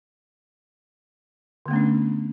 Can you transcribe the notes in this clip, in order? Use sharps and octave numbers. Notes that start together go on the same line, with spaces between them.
D3 A3 B3 C#4 D4